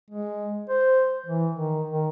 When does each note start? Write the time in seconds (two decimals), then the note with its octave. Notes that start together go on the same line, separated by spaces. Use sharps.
0.10 G#3
0.69 C5
1.26 E3
1.55 D#3
1.91 D#3